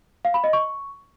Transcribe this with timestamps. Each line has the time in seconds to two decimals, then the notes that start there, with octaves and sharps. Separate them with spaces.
0.25 F5
0.34 B5
0.44 D#5
0.53 C#6